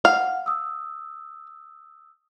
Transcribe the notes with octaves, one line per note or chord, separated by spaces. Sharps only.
F5 F#5
D#6 E6